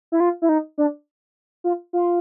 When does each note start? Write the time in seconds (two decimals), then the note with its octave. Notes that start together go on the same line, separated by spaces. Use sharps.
0.12 E4
0.20 F4
0.42 E4
0.49 D#4
0.78 D4
1.64 F4
1.93 F4